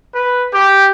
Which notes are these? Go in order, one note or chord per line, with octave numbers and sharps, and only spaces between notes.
B4
G4